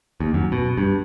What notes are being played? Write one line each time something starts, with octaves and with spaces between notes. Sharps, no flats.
D#2
F#2
B2
G2